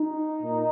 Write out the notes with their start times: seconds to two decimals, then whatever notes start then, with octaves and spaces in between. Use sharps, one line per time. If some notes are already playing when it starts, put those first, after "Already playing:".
Already playing: D#4
0.42 A#2